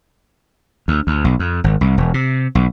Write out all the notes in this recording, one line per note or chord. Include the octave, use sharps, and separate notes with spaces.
D2
D2
B1
F2
G#1
C2
E1
C3
B1